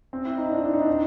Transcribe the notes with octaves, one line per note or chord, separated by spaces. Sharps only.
C4
E4
D#4
D4
D#4
D4
D#4
D4
D#4